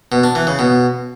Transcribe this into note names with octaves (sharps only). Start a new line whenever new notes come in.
B2
D4
E3
C#3
B2